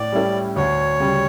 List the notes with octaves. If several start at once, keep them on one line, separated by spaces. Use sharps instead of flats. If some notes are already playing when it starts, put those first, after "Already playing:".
Already playing: A2 D5
G3 C#4 E4 A4
D2 C#5
C#3 G3